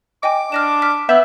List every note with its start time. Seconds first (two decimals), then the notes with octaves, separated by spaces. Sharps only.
0.23 D#5 G5 G#5 D6
0.52 D4 F6 A#6 E7
0.82 F6 B6
1.09 B3 E5 G6